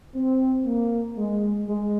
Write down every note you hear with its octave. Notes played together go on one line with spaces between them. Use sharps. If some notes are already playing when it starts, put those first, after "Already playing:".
C4
A#3
G#3
G#3